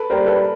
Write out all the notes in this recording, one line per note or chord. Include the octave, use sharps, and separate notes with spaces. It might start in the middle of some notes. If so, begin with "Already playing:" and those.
Already playing: A4 B4
G3 A#4 C5
A4 B4